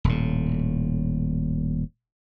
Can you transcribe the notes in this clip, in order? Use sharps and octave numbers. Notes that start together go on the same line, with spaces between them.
D#1 A2